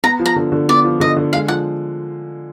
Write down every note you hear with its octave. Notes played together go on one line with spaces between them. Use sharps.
B3 A#5
F3
A#5
D3
D3
B3 D5
F3
D3 D#5
D3
G#3 F5
F3 F#5